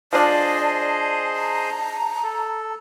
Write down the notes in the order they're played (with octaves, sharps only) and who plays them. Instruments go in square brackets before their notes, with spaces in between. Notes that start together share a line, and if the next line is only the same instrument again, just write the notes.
[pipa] F3 D4 [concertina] G#4 C5 D#5 [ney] D5 [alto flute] A5
[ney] A#5
[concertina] A4